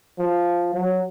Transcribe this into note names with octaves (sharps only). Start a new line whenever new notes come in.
F3
F#3